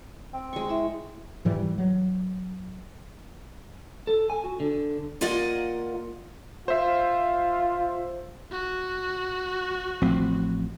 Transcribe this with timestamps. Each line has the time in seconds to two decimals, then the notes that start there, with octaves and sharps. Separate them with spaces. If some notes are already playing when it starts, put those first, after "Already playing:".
0.34 C4
0.53 G#3 C#6
0.69 E4 E5
1.45 G#2 E3 G3
1.78 F#3
4.07 A4
4.30 G#5
4.44 F#4
4.60 D3
5.21 A#3 F4 A#4 D5 D#5 F#5
6.68 F4 C5 E5
8.51 F#4
10.02 A1 F3 C4